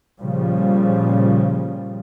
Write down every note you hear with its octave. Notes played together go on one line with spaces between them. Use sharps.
A#2 C#3 F3 G3